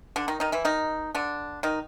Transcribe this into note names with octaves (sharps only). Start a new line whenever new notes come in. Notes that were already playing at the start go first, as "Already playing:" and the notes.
D3 D4
D#3 D#4
D#3 D#4
E3 E4
D#3 D#4
D3 D4
D#3 D#4